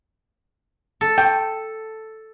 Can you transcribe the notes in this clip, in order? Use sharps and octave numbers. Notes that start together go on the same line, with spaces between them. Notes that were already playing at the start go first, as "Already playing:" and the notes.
A4
G5